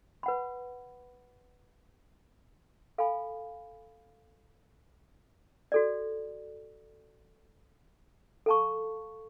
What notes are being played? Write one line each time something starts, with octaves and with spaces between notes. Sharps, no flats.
B4 F#5 B5
A4 F5 G#5 B5
F#4 A4 D5
A4 F5 A5 C#6